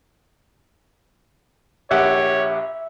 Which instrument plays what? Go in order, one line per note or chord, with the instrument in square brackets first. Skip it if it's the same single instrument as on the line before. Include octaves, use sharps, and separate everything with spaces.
[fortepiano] A#1 G4 F#5 [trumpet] C#5 [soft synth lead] E5